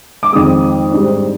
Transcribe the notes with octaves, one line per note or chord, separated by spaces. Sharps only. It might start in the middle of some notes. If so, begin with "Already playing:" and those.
D6
F2 D#3 G#3 D#6
G#2 G3 D4